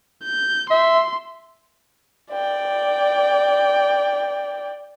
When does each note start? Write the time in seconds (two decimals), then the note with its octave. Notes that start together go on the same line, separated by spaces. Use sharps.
0.24 G6
0.70 E5 C6
2.33 D5 G5